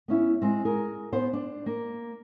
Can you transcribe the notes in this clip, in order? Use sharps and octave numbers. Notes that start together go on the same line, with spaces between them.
B3 C#4 E4
G#3 C4
G#4 A#4
B3 C5
D4
A#3